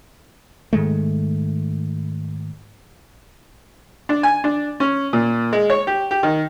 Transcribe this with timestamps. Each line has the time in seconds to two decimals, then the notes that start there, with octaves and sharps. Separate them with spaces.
0.73 G#2 D#3 G#3 A3
4.09 D4
4.23 G#5
4.44 D4
4.80 C#4
5.13 A#2
5.53 G#3
5.70 C#5
5.87 G4
6.11 G4
6.23 D#3